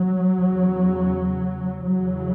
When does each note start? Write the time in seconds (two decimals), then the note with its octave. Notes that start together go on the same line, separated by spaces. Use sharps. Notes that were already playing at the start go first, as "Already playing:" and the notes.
Already playing: F#3
0.35 E2 C#3
1.84 E2 C#3 F#3